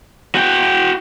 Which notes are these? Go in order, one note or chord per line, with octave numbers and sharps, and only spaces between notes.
F#4 G5